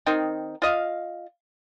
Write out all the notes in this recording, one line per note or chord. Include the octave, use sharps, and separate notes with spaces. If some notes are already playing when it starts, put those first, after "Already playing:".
D#3 C4 D#4
F4 D#5 F5